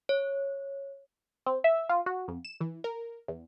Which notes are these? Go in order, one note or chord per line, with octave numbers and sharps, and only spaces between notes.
C#5
C4
E5
F4
F#4
F2
E7
E3
A#4
E2